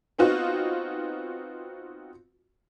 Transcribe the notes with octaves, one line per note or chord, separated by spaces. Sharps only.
B3 C4 D#4 F4 F#4